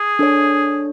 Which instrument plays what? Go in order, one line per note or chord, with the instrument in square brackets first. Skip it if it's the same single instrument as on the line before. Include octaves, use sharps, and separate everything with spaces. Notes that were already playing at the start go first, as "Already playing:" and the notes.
Already playing: [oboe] G#4
[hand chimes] D4 A4 C#5